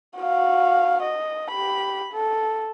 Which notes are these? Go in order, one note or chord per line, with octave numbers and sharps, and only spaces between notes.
F#4 F5
D#5
G4 B5
A4